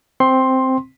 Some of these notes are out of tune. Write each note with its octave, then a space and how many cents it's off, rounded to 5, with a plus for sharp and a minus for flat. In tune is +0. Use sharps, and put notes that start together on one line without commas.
C4 +0 C6 +10